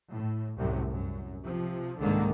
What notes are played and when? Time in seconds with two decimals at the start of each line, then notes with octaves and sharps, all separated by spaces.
0.10 A2
0.56 C2 F#2 A2 C3
0.89 F#2
1.44 C3 F3
1.99 C2 G#2 D3 D#3 G#3 A#3